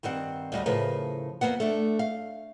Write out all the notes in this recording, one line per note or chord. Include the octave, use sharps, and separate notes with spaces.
G2 D#3 G3 C4 F#5
D2 G3 D#5
A2 C#3 F3 A#4 B4
F2 F#3 A#3 B3 F#5
A3 D4
F5